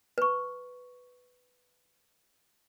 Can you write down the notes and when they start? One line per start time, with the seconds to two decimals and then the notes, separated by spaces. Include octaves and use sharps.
0.18 B4 C#6